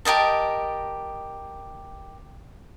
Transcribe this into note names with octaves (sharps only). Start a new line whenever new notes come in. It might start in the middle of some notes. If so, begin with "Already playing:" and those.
G4 A#4 D#5 A5